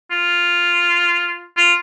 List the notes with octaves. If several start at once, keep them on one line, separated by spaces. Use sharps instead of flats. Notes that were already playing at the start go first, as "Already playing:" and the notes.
F4
F4